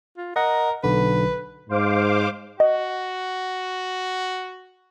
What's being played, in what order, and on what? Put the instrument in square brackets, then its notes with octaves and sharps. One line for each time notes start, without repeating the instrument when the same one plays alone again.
[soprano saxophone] F4
[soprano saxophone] A#4 [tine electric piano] D#5 F#5
[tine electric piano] B1 D3 [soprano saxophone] B4
[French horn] G#2 [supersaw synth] C5 F5 D6
[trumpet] F#4 [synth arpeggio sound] D#5